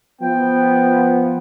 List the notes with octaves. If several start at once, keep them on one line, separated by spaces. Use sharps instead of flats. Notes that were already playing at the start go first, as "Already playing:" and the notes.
F3 B3 G5